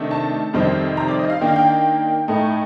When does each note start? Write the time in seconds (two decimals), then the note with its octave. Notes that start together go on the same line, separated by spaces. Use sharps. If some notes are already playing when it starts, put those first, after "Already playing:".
Already playing: C3 D#3 A3 D4
0.11 A5
0.53 F2 C3 D#3 G3 C4
0.97 A#5
1.08 D5
1.19 D#5
1.30 F5
1.41 D#3 A#3 D4 G5
1.48 F5
1.56 G5
2.28 A2 A3 D#4